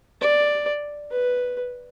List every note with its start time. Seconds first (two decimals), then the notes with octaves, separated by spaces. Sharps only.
0.22 D5
1.12 B4